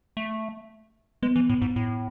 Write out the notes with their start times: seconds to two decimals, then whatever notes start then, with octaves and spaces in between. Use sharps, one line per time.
0.17 A3
1.23 G#3 B3
1.36 E3
1.49 A2
1.62 G#2
1.76 A2